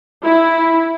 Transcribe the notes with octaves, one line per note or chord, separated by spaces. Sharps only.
E4